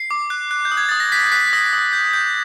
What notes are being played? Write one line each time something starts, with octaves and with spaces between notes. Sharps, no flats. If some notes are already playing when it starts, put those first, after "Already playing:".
Already playing: C7
D6
F#6
F#6
G6
D#6
G#6
D#6 A6
A#6
F#6 B6
F#6 B6
B6
D#6 A#6
D#6
G6
G6